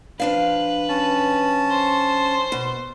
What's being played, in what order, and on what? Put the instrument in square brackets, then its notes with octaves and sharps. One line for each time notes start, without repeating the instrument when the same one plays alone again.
[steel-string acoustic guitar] F3 D4 F5 [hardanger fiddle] B4
[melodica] C#4 A5
[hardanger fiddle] C5
[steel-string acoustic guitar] B2